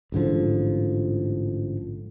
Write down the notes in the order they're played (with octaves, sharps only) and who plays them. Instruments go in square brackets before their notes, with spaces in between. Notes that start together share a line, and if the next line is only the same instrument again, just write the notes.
[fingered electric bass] A1 G#2 D3 F3